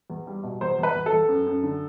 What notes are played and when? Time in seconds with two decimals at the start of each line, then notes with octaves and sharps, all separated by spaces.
0.10 E2
0.27 G3
0.43 B2
0.61 E2 C5
0.79 E2 B4
0.95 E2
1.06 A4
1.13 E2
1.29 F#2
1.47 F#2
1.63 D3